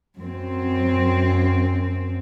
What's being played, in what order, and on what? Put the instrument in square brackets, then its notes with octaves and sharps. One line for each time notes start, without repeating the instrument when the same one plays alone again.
[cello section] F#2 C4